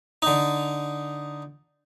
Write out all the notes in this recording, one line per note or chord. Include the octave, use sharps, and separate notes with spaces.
D3 D#4